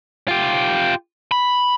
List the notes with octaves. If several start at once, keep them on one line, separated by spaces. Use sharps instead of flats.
F4 G4
B5